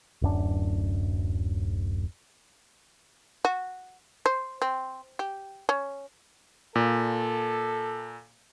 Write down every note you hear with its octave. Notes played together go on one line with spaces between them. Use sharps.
D1 F#2 D4
F#4
C5
C4
G4
C#4
A#2 A4